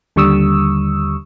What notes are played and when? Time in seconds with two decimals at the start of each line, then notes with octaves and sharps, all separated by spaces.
0.16 D#2 D3 G3 C#6 D#6 E6